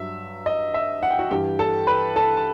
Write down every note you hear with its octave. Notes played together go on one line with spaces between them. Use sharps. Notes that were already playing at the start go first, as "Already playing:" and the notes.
Already playing: G2 F#3 E5
D#5
E5
F#5
G5
F#4 F#5
G2 E3 G4 G5
A4 A5
B4 B5
A4 A5
A5